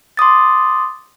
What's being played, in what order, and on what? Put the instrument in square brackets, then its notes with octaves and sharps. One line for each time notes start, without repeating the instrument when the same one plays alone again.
[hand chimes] C6 D6 D#6 A6